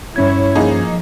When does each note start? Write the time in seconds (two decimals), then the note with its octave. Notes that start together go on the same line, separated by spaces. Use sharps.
0.16 G2 C#4 E4 C#5 G#6
0.56 F3 A#3 D#4 G#4